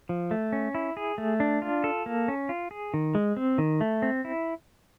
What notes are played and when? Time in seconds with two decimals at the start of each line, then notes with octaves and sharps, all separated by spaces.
0.09 F3
0.31 A3
0.53 C#4
0.75 E4
0.97 G#4
1.18 A3
1.40 D4
1.62 F4
1.84 A4
2.06 A#3
2.28 C#4
2.49 F4
2.71 G#4
2.94 D#3
3.15 G#3
3.37 C4
3.58 D#3
3.81 A3
4.02 C4
4.25 E4